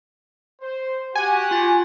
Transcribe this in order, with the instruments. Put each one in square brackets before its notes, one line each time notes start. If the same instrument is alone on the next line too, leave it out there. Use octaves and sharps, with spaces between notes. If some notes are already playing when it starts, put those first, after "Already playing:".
[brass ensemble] C5
[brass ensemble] F#4 G4 F#5 [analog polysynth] G#5
[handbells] F4 A6